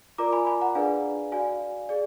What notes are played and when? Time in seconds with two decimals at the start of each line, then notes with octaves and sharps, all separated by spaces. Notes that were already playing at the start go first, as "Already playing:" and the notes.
0.18 F4 A#4 D5 A#5 D6
0.33 G#5 B5
0.47 G#5 B5
0.61 F#5 A#5
0.75 D4 G#4 B4 D5 F5 G#5
1.32 F#4 D5 F5 G#5
1.89 G#4 D5